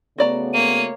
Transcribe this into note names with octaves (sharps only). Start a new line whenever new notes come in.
C#3 A3 B3 F#4 D5 A#5
A#3 C#5 D#7